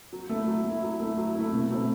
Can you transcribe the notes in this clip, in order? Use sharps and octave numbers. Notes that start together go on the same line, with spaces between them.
F#3
A3 E4
F#3
A3 E4
F#3
A3 E4
F#3
A3 E4
B2
F#3 A3 C4 E4